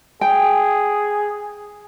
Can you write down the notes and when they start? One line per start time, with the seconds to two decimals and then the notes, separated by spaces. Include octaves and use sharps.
0.21 G#4 G5